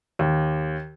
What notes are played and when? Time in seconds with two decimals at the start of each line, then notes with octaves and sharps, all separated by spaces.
0.19 D#2